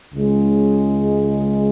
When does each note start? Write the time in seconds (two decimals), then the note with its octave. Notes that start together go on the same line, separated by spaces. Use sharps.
0.15 C#2 C#3 G#3